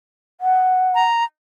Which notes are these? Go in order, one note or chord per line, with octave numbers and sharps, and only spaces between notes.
F#5
A#5